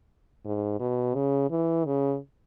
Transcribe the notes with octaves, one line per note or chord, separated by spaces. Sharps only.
G#2
B2
C#3
E3
C#3